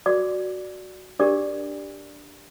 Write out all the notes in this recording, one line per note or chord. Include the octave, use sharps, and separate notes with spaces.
F#4 A#4 D5 D6
D4 G4 A#4 D5 D6